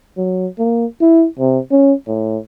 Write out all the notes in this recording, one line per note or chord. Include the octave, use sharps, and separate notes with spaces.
F#3
A#3
E4
C3
C#4
A2